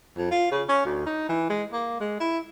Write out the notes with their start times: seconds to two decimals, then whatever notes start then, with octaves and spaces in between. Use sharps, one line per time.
0.17 F2
0.31 F4
0.51 C#3
0.69 C#4
0.85 D2
1.06 D#4
1.29 E3
1.50 G#3
1.72 A#3
2.00 G#3
2.20 E4